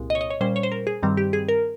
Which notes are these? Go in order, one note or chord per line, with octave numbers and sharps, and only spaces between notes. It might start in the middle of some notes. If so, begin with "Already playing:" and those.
Already playing: C2 A#2 G#3
D#5
C#5
D#5
C#5
A#2 G3 C#4 C5
C#5
C5
A#4
G#4
G2 D#3 G3 C4
G4
G#4
A#4